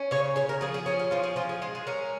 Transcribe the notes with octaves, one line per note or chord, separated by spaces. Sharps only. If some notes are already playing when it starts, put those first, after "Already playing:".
Already playing: C#4
C#3 C#5
C#3 C#5
A#4
F3 G#4
G#4
C#4 G#4
F4
F3 F4
G#4
F3 F4
G#4
G#3 F4
G#4
C#4 A#4